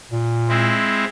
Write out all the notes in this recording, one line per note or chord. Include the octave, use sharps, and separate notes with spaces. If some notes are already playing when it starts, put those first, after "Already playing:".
A#2
G#3 C4 E4